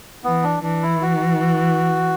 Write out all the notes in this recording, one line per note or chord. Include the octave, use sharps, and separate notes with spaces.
E3 B3
D4
E3 D4
E4
F#4